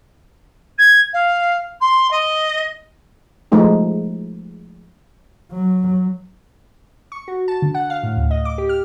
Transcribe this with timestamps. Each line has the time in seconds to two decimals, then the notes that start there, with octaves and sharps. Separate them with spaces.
0.78 G#6
1.13 F5
1.80 C6
2.11 D#5
3.52 F3 G#3 A3 D#4 G#4
5.52 F#3
7.12 C#6
7.28 F#4
7.48 A5
7.62 D3
7.74 F#5
7.90 F5
8.03 A2
8.17 D2
8.31 D#5
8.45 D6
8.58 G4
8.69 F6